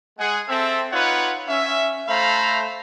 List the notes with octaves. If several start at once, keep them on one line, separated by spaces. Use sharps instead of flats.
G#3 G#4 F#5
C4 A4 E5
D#4 F4 B4 C#5 F#5
C#4 E5
A3 A4 C5 F5 A#5 B5